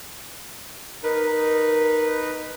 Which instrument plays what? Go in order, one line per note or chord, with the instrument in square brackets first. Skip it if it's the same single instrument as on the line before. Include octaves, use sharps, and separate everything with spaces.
[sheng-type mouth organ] D#4 B4 [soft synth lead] A#4